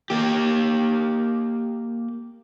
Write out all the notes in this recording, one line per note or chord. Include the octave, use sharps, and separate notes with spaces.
A#3 G4